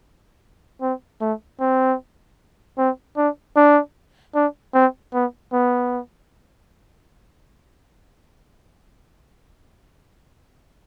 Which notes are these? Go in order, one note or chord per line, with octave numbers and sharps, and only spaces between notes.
C4
A3
C4
C4
D4
D4
D4
C4
B3
B3